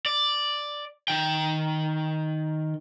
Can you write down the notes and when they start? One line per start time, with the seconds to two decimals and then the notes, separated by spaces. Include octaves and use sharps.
0.06 D5
1.08 D#3 G5